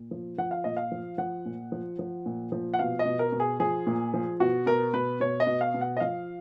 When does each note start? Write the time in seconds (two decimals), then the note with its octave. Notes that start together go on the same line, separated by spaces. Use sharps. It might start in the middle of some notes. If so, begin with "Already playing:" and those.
Already playing: A#2
0.11 F3
0.38 F3 F#5
0.51 F5
0.64 A#2 D#5
0.77 F5
0.92 F3
1.18 F3 F#5
1.46 A#2
1.72 F3
1.99 F3
2.26 A#2
2.52 F3
2.74 F#5
2.79 B2 F5
2.99 D#5
3.06 B2
3.19 A#4
3.32 B2
3.40 G#4
3.60 F3 G#4
3.87 A#2
4.14 F3
4.40 B2 F#4
4.66 B2 A#4
4.93 B2 B4
5.20 B2 C#5
5.40 D#5
5.47 B2
5.61 F5
5.74 B2
5.81 F#5
5.97 D#5
6.00 F3 F5